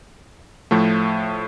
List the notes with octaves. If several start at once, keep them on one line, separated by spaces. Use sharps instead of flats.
A2 F3 A3